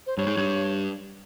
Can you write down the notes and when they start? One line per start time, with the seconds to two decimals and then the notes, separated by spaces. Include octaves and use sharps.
0.06 C5
0.17 G2 C#5
0.27 G#2
0.37 G2